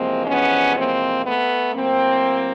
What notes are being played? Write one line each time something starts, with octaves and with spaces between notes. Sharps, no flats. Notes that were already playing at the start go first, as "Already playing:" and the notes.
Already playing: E2 C3 F3 G#3 A#3 C4
B3 C#4
A#3 C4
A3 B3
A2 F#3 A#3 C4